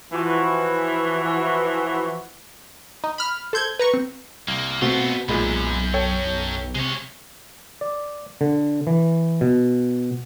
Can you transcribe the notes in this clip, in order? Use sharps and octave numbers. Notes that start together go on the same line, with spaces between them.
E3 F3 F#4
D#4
B5 F6
A4 C5 G6 G#6
B4 A#5 C#6
C4
C2 A#3
B2 A3 B3 C4 F4 F#4
B1 F#2 A#2 G#3 B5
A4 C#5 G5
B1
C3 G#3 C#5
D5
D3
E3
B2